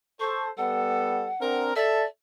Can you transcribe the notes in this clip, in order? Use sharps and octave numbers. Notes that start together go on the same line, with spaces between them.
A4 C5 C#6
G3 B3 A4 F#5
C4 D4 A#4
A4 D5 E5